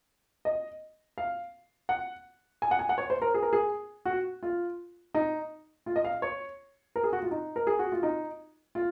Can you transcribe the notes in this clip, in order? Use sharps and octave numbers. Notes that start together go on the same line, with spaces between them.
D#5
F5
F#5
G#5
F#5
G#5
F#5
C#5
C5
A#4
G#4
A#4
G#4
F#4
F4
D#4
F4
D#5
F5
C#5
A#4
G#4
F#4
F4
D#4
A#4
G#4
F#4
F4
D#4
F4